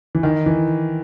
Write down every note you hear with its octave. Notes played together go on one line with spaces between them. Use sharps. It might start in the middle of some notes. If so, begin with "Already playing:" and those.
E3
D#3
E3